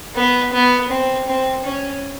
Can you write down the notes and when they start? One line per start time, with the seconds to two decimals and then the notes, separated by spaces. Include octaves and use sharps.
0.15 B3
0.53 B3
0.90 C4
1.27 C4
1.64 C#4